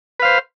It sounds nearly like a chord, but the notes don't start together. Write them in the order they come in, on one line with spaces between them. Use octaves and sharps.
B4 F5 C5